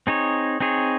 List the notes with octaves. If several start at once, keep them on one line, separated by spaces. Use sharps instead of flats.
C4 D#4 G#4 C#5
C4 D#4 G#4 C#5